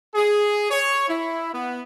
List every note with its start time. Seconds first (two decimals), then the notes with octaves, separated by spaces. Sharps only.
0.15 G#4
0.71 C#5
1.08 E4
1.53 B3